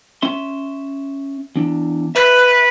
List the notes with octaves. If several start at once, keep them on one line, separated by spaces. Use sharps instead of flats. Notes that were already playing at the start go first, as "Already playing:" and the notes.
C#4 E5 C6
E2 D4
B4 E5